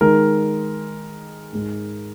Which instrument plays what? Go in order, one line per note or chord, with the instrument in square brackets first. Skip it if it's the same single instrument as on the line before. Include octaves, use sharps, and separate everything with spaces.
[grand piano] D#3 G#3 D#4 A#4
G#2 G#3 D#4